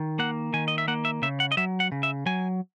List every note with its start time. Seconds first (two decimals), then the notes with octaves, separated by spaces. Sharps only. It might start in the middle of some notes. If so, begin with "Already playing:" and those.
Already playing: D#3
0.19 A#3 F#5
0.54 D#3 G#5
0.68 D#5
0.78 E5
0.88 A#3 F#5
1.05 E5
1.22 C#3 E5
1.40 F#5
1.52 D#5
1.57 F#3 E5
1.80 F#5
1.92 C#3
2.03 E5
2.26 F#3 G#5